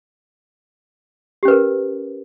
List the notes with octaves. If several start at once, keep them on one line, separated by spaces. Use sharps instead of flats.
C#4 G4 A#4 B4